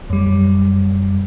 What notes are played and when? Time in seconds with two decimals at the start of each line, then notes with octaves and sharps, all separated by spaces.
0.10 F#2 G3